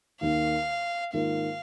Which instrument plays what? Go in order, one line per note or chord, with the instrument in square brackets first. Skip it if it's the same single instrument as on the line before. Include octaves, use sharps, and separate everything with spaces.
[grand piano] D#2 D#3 A#3 [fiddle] F5
[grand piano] G#2 D#3 A#3 F4 A#4 [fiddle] F5